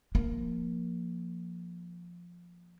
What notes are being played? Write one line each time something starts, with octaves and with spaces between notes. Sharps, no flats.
F3 A#3